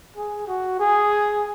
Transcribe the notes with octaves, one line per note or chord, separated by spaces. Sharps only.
G#4
F#4
G#4